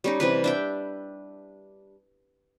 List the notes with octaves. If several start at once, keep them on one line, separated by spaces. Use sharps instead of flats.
G3 C#4 D#4
C3 E3 B4
D4 E5 G5